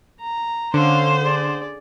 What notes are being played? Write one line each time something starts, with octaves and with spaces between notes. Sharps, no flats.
A#5
D3 C#4 C5 F5
G#4 D5